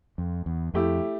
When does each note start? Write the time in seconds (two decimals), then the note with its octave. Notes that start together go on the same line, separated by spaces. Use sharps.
0.18 F2
0.46 E2
0.74 F2 A3 E4 G4